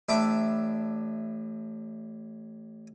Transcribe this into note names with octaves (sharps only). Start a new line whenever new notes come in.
A1 D4 E5 B5 D6